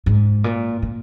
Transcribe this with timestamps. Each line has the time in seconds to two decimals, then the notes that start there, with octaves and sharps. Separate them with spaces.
0.06 G#2
0.44 A#2
0.82 A#2